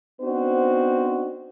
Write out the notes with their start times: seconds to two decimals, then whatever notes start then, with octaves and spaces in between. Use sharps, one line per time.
0.22 B3 C4 D4 D#4 F#4 C5